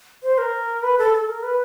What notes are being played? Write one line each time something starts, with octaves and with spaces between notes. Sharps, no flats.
C5
A#4
B4
A4
A4
A#4
B4